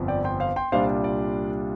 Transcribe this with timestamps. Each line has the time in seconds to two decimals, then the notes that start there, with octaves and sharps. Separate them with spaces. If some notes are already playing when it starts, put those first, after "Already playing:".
Already playing: G1 F2 F3 C4
0.08 D5 G5
0.24 G5 C6
0.40 C5 F5
0.56 G5 C6
0.72 C2 A#2 G3 D4 F4 C5 F5
1.04 D5